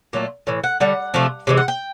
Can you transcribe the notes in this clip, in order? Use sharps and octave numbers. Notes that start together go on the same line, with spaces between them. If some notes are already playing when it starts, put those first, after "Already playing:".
A#2 F#3 A3
A2 E3
F#5
D3 G3 F#5
C3 F3 A3
C3 E3 G#3
F#5
G5